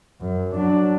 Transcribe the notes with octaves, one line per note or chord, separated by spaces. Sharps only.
F#2
F#3 D4